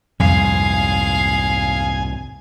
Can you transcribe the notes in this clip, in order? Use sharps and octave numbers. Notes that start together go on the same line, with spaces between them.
C2 F2 G#2 G#4 F5 G#5